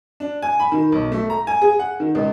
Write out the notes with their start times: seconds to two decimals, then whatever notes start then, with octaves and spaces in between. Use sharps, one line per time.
0.20 D4
0.42 G#5
0.60 B5
0.72 D#3
0.92 B1
1.12 A3
1.30 A#5
1.47 G#5
1.62 G#4
1.79 F#5
2.00 D#3
2.15 C#2